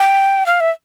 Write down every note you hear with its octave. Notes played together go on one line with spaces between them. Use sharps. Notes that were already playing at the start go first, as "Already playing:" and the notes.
Already playing: G5
F5
E5